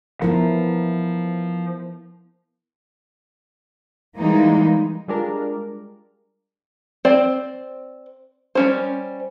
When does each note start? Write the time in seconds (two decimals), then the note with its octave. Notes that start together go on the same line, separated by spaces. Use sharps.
0.22 F3 B3 E4 A#4
4.16 E3 G3 G#3 A#3 D#4
5.08 G3 G#3 D4 F4 A#4 D5
7.05 C4 C5 D5
8.55 G3 C#4 C5